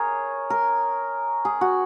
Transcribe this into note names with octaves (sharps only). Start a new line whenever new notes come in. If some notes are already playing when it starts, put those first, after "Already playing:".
Already playing: G#4 A#4 C#5
A#4
G#4
F#4